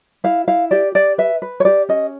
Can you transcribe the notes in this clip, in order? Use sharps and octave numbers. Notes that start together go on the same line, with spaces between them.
E4 F5
E4 F5
G4 D5
G4 D5
B4 E5
B4
C#5
G4 D5
C#4 D#5